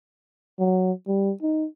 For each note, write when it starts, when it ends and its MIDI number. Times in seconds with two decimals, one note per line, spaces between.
0.59 0.92 54
1.07 1.32 55
1.42 1.66 63